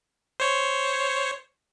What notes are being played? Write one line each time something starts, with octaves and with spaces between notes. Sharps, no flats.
C5 C#5